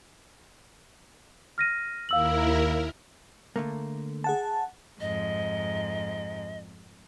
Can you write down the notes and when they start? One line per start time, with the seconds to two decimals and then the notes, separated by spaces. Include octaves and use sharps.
1.58 F6 A#6 D#7
2.09 D#2 E4 A#4 F5 E6 F#7
3.56 D3 A3 A#3
4.24 G#4 F#5 A5
5.00 F2 G#2 D#5